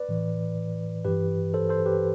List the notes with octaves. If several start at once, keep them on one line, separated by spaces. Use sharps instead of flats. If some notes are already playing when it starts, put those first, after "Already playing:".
Already playing: B4 D5
A2 E3
G2 E3 G4 B4
A4 C5
A4 C5
G4 B4